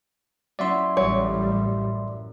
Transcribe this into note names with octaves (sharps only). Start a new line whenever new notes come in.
F#3 C#4 E4 D5 E5 C6
A1 F#2 G3 C#5